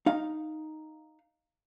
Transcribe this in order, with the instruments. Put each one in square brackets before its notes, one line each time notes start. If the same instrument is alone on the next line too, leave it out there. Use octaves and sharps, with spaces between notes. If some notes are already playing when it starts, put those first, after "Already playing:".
[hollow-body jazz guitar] D#4 F5